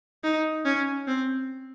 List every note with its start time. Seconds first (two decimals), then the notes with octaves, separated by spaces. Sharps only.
0.24 D#4
0.65 C#4
1.07 C4